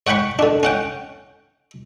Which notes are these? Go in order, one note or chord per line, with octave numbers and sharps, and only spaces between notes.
C#5 F#5 G5 B5 C#6
D3 D4
C#4 F#5 G5